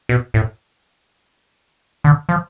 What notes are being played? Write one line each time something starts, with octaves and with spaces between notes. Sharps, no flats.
B2
A2
D3
F3